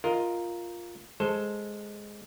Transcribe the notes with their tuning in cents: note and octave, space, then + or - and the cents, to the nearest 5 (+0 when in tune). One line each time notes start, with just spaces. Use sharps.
F4 +0 A#4 +0 D#5 +15
G#3 +0 A4 +0 C5 +0